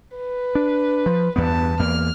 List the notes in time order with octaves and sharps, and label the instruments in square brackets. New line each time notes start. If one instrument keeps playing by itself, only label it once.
[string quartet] B4
[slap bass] D4
F3
[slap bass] E2 G2 B3 [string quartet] B4 A5
[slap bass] E2 A#3 [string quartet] F6